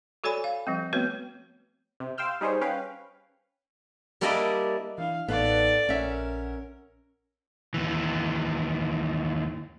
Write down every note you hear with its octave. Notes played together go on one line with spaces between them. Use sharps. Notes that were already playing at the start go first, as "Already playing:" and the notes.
F#4 A4 C#5 D5 G#5 B5
F5
F3 G3 C4
A3 B3 C4 F#4 B4 C#5
C3
F5 G5 C6 E6 F6 G6
G3 D#4 G#4 C5 C#5
C#4 B4 F5 G5
G3 A#3 D4 E4 D5 D#5
E3 D4 E4 F5
A1 B3 D#4 A4 D5 F5 F#5
A#1 C#4 A#4 E5 F#5 E6
D#2 E3